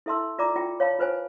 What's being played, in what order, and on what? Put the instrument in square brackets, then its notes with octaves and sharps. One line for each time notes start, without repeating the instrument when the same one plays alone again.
[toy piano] E4 A4 E5 A5 C6 E6
F4 D5 A#5 B5 D6
F4 G5
C#5 F5 A5 B5
F4 B4 C5 G#5